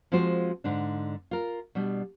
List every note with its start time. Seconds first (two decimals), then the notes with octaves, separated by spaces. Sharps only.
0.12 F3 G#3 C4 F4 F#4 C5
0.64 G#2 D3 D4
1.31 F4 A#4
1.75 B2 G3 D4